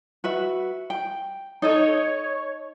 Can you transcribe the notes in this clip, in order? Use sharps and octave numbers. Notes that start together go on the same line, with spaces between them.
F#4 B4 E5
G5
D#4 A4 C#5 D#5